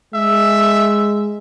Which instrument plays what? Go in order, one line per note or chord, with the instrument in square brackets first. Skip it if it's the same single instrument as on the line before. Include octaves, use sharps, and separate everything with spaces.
[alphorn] G#3 [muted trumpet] E5